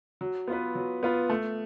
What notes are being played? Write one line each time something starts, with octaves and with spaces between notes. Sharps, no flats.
F#3
B3 F4 B4
F#3
B3 F4 B4
A3